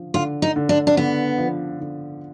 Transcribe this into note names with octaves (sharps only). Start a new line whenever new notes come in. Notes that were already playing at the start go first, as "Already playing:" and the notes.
Already playing: D3 F3
D3 F4
D#4
D3
D4
D4
D3 B3
F3
D3